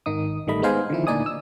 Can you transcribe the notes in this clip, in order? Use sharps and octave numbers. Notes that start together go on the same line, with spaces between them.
G#1 D#3 D#4 D#6
A1 D#3 G3 A3 D#5 B5
G#3 B3 D#4 C5 F5 G#5
D3 D#3 F3 E4
D2 A#2 D#4 D5 G#5 D#6
E6